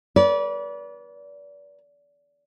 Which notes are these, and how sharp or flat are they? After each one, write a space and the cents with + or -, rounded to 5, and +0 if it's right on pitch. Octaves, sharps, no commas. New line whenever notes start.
B4 -35 D5 -30